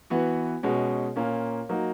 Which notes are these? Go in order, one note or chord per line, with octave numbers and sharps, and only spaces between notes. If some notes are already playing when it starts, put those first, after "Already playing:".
E3 B3 F#4
B2 G#3 C#4 F#4
A#2 A#3 C#4
F#3 A#3 D#4 F#4